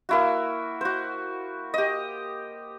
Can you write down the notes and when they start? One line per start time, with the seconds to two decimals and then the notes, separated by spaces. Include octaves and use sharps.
0.09 A#3 E4 F#4
0.81 F#4 C5
1.74 G4 D#5